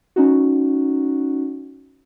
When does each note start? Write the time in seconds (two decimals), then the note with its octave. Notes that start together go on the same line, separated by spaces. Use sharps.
0.16 C#4 D#4 F#4